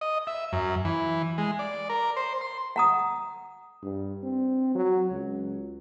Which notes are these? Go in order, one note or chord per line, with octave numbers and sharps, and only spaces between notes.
D#5
E5
F#2
E3
G#3
D5
A#4
C5
C6
F#5 A#5 D#6
G2
C4
F#3
C#2